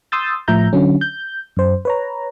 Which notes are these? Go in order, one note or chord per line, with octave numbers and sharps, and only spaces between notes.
C6 D#6 E6 G6 A6
A2 F3 E5 A#5 G6
D3 F#3 C#4
G6
F#2 C5
B4 C#5 A#5